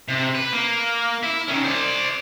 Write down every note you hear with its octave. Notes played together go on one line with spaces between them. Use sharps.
C3
B4
A#3
E4
D#3 C#4
C5 D5